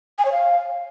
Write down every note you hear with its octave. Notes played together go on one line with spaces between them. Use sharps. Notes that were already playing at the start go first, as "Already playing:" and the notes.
G#5
C#5
F5